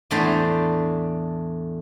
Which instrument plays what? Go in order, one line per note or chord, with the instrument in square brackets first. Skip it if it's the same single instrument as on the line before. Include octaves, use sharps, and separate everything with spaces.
[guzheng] E2 A2 A3 D4 C5 A#5